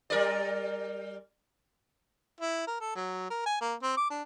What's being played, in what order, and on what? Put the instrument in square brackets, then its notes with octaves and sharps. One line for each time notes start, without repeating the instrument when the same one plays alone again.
[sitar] G3 A#4 D5
[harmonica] E4
A#4
A4
F#3
A#4
G#5
A#3
C4
D6
D4